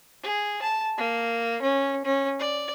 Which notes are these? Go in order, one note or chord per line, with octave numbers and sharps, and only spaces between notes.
G#4
A5
A#3
C#4
C#4
D5